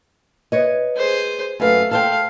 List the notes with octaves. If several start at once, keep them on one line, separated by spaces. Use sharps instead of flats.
B4 C#5 D#5
G#4 C5
F#2 A3 B4 F5
A4 C5 F5 G5